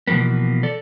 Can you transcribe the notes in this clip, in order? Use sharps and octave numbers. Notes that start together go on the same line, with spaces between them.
B2 E3 F3 A#3 B3
A4 D5